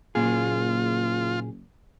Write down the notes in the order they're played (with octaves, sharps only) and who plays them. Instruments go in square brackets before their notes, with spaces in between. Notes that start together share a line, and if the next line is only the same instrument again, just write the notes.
[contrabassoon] F#1 [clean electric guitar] A#2 G#4 [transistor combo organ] F4